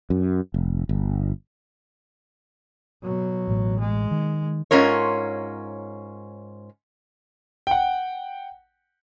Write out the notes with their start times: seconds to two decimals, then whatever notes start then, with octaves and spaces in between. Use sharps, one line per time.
0.10 F#2
0.54 F1
0.89 G1
3.03 B2 F#3
3.48 A1 A2
3.80 G#3
4.11 D#3
4.71 G#2 C#4 F4 A#4 C#5
7.67 F#5 G5